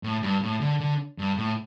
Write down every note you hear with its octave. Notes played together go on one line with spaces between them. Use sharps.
A2
G2
A2
D3
D3
G2
A2